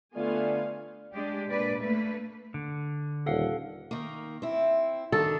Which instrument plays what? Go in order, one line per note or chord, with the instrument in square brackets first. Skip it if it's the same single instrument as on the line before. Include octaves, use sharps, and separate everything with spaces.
[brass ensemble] D3 A3 [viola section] B3 F5 G#5 [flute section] F4 [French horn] D5
[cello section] G#3 D4 G4
A#2 D4 B4 D5
A3 A#3 B4
[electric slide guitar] D3
[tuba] D#1 [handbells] A4 F5 F#5
[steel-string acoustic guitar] D#3 A#3
C4 E4
[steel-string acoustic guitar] D#3 D4 [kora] A4